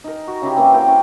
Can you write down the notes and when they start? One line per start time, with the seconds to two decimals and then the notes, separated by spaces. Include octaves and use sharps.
0.04 D#4 A#4
0.27 F#4
0.42 C#3 C#4 E4 G4
0.57 E3 F#3 A#3 C4
0.74 A#3 E4 G5
0.88 C#4